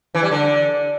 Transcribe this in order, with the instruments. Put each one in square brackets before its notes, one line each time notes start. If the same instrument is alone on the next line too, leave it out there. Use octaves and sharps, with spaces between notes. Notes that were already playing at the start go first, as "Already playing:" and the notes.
[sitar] E3
G3
D3